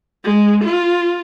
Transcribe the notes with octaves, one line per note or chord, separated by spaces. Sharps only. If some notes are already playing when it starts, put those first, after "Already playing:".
G#3
F4